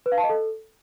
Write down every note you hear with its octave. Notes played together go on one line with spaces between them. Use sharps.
B4
F5
A5
D#5
A4